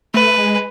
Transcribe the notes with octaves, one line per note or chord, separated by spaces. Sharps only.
A3 B4
G#3